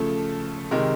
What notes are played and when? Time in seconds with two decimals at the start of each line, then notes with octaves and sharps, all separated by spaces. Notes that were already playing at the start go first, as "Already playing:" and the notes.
Already playing: C#3 F3 A3 A4
0.71 C3 D#3 G#3 A#4